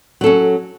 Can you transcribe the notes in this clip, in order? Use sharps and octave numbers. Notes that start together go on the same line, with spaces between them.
F#3 C#4 A4